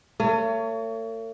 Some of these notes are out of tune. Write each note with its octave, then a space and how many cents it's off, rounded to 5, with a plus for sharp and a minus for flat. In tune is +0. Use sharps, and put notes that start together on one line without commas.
A3 +45 C#5 +20